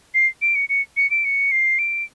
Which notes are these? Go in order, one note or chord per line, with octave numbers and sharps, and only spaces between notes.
C7
D7
C#7
C#7
C#7
D7
C#7
C7
D7